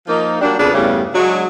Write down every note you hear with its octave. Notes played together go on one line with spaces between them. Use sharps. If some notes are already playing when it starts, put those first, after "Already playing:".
F3 A#3 D#4
F#3 G3 A#3 D4
F2 C#3 B3 D4 G#4 B4
E2 G2 C#3 G3 A3 B3
F#3 G#3 D4